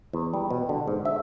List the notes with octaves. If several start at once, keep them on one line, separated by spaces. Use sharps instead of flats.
E2
G3
B2
D3
G#2
E5